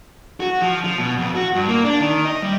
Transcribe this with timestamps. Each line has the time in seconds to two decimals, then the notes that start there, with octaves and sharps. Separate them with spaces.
0.40 F#4
0.62 F3
0.84 F3
0.98 B2
1.18 F2
1.35 F#4
1.54 G2
1.67 A#3
1.84 D4
2.00 D#3
2.25 D#5
2.42 G3